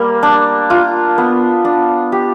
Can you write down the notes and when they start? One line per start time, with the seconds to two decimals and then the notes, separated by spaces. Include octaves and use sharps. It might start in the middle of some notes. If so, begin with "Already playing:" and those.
Already playing: G3 A#3
0.23 D4
0.70 F4
1.18 B3
1.65 D4
2.12 G4